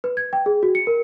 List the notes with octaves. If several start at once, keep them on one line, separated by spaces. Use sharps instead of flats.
B4
G#6
G5
G#4
F#4
C#7
A#4